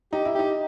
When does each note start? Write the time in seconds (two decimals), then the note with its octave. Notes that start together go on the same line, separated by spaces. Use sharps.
0.13 D#4 G4
0.25 E4
0.35 D#4 G4